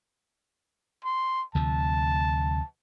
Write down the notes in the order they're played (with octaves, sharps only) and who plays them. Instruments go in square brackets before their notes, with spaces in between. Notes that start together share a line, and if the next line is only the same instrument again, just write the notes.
[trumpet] C6
[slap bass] D2 C3 F3 [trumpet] A5